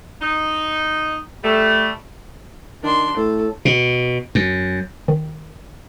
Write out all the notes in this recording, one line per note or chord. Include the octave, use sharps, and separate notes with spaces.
D#4
G3 A3
D#3 D4 C6
A2 A4
B2
F#2
D#3